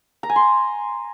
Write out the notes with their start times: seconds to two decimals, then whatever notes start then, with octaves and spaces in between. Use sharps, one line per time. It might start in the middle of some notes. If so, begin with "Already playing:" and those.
0.23 A#5
0.29 G#5
0.36 C6